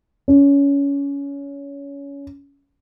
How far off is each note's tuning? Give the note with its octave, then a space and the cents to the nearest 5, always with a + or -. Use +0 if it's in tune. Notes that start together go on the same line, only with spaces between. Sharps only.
C#4 +20